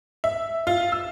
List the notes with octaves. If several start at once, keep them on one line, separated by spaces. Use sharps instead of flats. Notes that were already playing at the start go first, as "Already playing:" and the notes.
E5
F4
E6